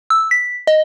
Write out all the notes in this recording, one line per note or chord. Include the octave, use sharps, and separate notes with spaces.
E6
B6
D#5